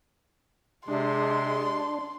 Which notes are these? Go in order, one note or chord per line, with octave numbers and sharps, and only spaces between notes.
C3 G#3 D4 C6